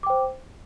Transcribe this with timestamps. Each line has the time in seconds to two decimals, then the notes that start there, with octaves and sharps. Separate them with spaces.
0.03 D6
0.07 G5
0.10 C5